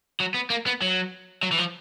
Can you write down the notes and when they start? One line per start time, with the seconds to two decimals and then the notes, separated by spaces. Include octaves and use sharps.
0.20 F#3
0.34 B3
0.50 A#3
0.66 B3
0.82 F#3
1.43 F#3
1.51 E3
1.58 F3